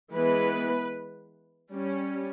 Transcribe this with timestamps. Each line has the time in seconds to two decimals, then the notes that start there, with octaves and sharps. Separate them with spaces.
0.13 E3 G#3 B3 B4
1.71 G3 C#4